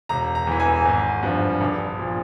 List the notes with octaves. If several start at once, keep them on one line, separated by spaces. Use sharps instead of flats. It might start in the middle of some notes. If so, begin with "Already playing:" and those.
E1 A#5
A#5
E2 E3
G#5
G#1
G2 F3
A#1
A#2 F3